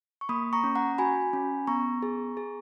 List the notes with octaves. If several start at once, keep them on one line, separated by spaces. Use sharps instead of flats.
C#6
A#3 B5 D#6
A#5 C#6
C#4
F#5 A#5
F#4 G#5 B5
C#4
B3 A#5 C#6
G#4
G#4